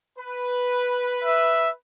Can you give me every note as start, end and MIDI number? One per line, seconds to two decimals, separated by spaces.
0.19 1.73 71
1.24 1.70 76